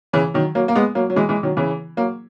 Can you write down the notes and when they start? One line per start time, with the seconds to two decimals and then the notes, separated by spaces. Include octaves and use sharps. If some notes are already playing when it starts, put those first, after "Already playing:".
0.13 C#3 E3
0.34 D#3 F#3
0.55 F#3 A#3
0.68 A#3
0.75 G#3 B3
0.95 F#3 A#3
1.10 F#3
1.16 E3 G#3
1.29 E3 G#3
1.43 D#3 F#3
1.57 C#3 E3
1.97 F#3 A#3